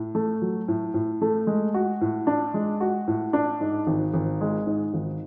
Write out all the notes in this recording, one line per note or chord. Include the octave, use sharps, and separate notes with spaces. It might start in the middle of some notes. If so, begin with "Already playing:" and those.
Already playing: A2
A3
F#3
A2
A2
A3
G#3
F#4
A2
D4
G#3
F#4
A2
D4
G#2
G#1
G#1
G#3
G#2
G#1